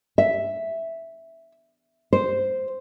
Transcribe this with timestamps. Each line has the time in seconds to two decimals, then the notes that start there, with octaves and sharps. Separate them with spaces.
0.18 E5
2.13 C5